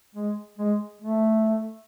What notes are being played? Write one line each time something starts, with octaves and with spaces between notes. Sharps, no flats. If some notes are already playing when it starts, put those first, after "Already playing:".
G#3
G#3
A3